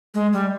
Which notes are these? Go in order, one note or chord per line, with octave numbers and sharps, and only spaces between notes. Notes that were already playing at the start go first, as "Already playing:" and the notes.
G#3
G3